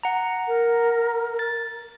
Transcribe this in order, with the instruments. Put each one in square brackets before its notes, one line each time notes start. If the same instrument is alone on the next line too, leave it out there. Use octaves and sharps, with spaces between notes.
[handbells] F#5 A#5
[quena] A#4
[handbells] A6